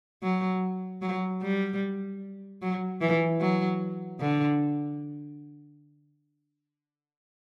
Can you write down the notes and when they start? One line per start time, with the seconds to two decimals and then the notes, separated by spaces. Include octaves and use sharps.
0.23 F#3
1.02 F#3
1.42 G3
2.62 F#3
3.01 E3
3.41 F#3
4.20 D3